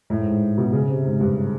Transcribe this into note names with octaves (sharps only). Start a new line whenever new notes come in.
A2
G#2
G#2
B2
C#3
C3
G#2
G2